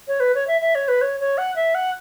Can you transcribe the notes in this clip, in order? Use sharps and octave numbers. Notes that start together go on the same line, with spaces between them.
C#5
B4
C#5
E5
E5
C#5
B4
C#5
C#5
F#5
E5
F#5